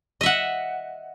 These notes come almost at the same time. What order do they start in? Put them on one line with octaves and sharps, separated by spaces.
D#5 E5 F#5